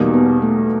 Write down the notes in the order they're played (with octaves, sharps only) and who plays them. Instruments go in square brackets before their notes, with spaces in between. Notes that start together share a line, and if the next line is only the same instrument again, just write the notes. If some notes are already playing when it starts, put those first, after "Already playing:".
Already playing: [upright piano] E2 B2 G3 A#3 D#4
[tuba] B3
A3